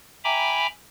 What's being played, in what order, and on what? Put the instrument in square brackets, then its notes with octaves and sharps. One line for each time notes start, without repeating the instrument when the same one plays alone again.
[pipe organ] E5 G5 G#5 A#5 B5 D6